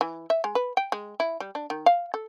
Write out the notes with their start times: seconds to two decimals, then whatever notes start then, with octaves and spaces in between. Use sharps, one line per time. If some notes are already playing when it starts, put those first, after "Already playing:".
0.01 E3
0.30 E5
0.44 G#3
0.55 B4
0.77 G5
0.92 G#3
1.20 E4
1.40 G3
1.55 D4
1.70 D#3
1.86 F5
2.14 A4